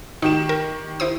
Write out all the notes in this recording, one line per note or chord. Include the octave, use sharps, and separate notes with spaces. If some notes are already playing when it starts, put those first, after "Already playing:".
D#3 D#4 G4 E7
A#4
E4 C5 D#6